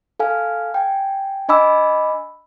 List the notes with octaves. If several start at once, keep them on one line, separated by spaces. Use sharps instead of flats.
A4 F5 G#5 F6
G5 G#5
D4 D#5 G#5 B5 D6 E6